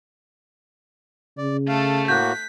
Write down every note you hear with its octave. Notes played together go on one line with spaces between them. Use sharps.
C#3 D5
A3 A4 F5
A2 A#3 F#4 F#6 G6 B6